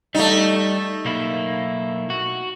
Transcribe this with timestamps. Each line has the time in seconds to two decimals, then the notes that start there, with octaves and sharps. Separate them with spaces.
0.15 G3 A3 D#4
1.05 B1 A#3 E4
2.10 F#4